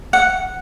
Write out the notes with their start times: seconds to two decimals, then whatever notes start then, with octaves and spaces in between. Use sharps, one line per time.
0.13 F#5